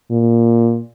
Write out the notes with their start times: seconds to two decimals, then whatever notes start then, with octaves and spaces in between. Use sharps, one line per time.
0.11 A#2